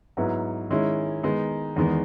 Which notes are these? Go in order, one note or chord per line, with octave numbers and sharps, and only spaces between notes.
G#2 F#3 B3 E4
D#3 G#3 C#4 E4
D#3 G#3 B3 D#4
E2 D#3 G#3 B3